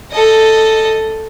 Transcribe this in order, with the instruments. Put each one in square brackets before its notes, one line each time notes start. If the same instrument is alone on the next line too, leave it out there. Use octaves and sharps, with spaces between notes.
[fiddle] A4 D#5